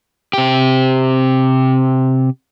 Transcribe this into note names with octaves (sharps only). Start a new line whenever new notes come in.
C3 G4